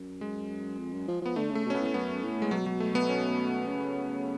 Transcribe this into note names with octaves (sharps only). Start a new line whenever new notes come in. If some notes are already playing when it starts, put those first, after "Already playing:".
Already playing: F#2
G#3
F2
F#2
F3
F3 B3
D3 A3
C#3
A3
B2 C#4
A2 B3
A3
F#2 B3
A2
G#3
B2 F#3
F#3
A3
B3
C#4
C#3